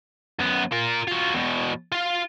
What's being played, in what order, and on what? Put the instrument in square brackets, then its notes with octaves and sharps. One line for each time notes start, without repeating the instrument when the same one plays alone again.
[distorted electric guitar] F#2 B3
F4 A#4
F#3 F4
E2 B2
F4 F5